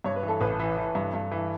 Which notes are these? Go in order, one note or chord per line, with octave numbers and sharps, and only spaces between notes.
G2 C#5
B4
E3
A4
A1 B4
E3
E3
G2
G2
E3